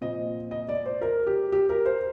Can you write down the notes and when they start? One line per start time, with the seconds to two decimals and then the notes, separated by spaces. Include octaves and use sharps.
0.01 A#2 F3 C4 D#5
0.51 D#5
0.69 D5
0.86 C5
1.01 A#4
1.27 G4
1.52 G4
1.69 A#4
1.86 C5